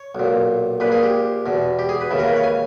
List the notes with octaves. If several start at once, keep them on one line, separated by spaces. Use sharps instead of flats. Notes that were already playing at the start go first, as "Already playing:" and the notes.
Already playing: C#5
B1 A#2
A#1 A#2 B4
G#4
G4
E2 B2
G4
G#4
B4
D#2 C#3 E3
A#4
B4
C#5
G#5